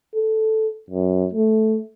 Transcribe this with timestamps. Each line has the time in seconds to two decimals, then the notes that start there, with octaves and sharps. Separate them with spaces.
0.15 A4
0.91 F#2
1.34 A3